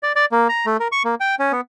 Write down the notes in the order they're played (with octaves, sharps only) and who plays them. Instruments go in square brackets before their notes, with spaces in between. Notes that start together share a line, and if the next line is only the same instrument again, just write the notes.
[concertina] D5
D5
A#3
A#5
A3
A#4
C#6
A#3
G5
C#4
B3